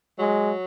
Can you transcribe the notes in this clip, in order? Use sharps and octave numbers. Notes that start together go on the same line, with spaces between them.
F#3 G#3